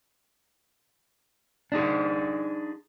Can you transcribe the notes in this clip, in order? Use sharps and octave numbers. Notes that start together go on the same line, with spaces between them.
D4 D#4 G#4